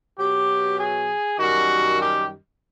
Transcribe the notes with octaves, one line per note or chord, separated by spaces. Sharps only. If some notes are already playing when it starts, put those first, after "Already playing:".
B2 F#3 G4
G#4
F#2 D#3 G3 F#4
G4